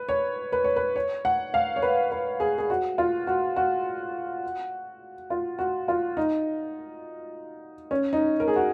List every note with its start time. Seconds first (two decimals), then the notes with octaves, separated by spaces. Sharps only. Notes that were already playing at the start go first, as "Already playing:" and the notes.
Already playing: B4
0.09 C#5
0.52 B4
0.64 C#5
0.76 B4
0.96 C#5
1.25 F#5
1.54 F5
1.76 C#5
1.82 B4
2.11 B4
2.40 G#4
2.58 G#4
2.70 F#4
2.98 F4
3.27 F#4
3.56 F#4
5.30 F4
5.59 F#4
5.88 F4
6.17 D#4
7.91 C#4
8.13 D#4
8.40 A#4
8.48 G#4
8.56 F#4